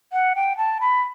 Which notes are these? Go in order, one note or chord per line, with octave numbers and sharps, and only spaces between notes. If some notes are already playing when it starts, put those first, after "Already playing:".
F#5
G5
A5
B5